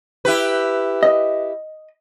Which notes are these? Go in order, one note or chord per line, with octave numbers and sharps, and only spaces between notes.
E4 G4 B4
D#5